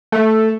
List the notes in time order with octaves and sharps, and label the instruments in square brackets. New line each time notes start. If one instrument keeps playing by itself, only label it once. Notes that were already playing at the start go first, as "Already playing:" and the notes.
[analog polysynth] A3